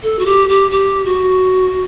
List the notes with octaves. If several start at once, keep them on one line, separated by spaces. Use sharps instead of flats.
A4
F#4
G4
G4
G4
F#4